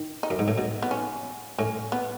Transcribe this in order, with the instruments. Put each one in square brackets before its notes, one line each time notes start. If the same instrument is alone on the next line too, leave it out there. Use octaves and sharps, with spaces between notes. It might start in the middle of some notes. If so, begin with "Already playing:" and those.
Already playing: [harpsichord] D#3
[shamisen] D#4
[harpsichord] F#2
G#2
A2
B2
[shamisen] B3
C#4
[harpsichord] A2 [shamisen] C#4
[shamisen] B3